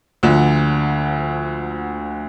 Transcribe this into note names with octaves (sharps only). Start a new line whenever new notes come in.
D2 D3 F3